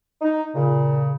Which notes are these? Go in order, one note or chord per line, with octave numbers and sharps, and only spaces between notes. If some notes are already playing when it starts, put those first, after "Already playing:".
D#4
A#2 C#3